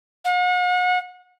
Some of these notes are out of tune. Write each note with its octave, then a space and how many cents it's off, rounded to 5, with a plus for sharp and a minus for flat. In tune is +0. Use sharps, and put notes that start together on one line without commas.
F#5 -40